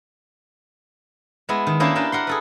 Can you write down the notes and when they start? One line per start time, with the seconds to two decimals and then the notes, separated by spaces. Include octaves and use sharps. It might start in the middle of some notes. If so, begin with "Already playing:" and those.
1.49 G#3 B3 E4
1.67 D#3
1.80 A#3 C#4 D4 E4 G4 G#4
1.96 D4 A#4 B4 G5 A5
2.12 A#4 F#5 C6
2.27 G#4 A4 B4